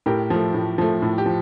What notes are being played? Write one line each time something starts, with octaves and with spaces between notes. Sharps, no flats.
A2 G4 A#4
F3 A3
A2
F3 A3
A2
G4
F3